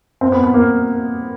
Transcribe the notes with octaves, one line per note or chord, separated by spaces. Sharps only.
C4
B3
B3
A#3